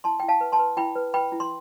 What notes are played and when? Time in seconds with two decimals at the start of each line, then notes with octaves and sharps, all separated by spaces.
0.04 E4 A5 C6
0.20 E4 G5
0.28 F5 A5
0.41 B4
0.52 A5 C6
0.59 B4
0.77 E4 G5 B5
0.96 B4
1.14 B4 G5 B5
1.32 E4
1.40 C6